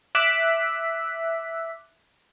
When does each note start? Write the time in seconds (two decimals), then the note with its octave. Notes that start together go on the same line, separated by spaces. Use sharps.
0.15 E5 D6 E6 F#6 B6